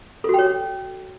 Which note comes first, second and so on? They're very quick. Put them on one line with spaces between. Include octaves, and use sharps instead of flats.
A4 F#4 G5 C#5